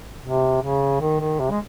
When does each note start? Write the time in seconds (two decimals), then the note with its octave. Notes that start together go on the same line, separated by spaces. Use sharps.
0.23 C3
0.62 C#3
1.01 D#3
1.20 D#3
1.40 C3
1.51 G#3